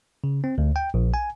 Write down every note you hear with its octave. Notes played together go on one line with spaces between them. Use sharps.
C#3
C4
D2
G5
A#1
G#5